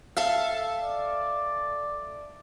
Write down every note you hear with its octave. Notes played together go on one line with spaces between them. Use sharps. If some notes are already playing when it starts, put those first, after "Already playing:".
A4 E5 F5
D5